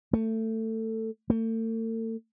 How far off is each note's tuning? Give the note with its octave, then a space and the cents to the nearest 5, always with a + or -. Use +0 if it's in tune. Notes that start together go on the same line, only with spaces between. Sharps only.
A3 +20
A3 +40